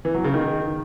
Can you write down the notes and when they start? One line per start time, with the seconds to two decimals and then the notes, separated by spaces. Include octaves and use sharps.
0.05 E3
0.15 F#3
0.24 C#3
0.34 D#3